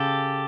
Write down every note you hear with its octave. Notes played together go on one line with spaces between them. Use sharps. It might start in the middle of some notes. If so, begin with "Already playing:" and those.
Already playing: C#3 G4 A4